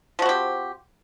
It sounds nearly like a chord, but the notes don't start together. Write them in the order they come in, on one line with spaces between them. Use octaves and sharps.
F3 F#4 C4 G4